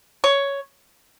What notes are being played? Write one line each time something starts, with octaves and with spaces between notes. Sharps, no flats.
C#5